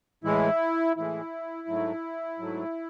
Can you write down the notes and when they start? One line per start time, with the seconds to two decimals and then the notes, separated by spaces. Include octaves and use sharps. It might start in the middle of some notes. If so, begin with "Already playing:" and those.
0.24 A2 E3 G#3 E4
0.96 A2 E3 G#3 E4
1.68 G#2 F#3 A3
2.39 G#2 F#3 A3